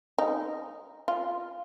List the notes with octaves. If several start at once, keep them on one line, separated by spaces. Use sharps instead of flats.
D#4
F4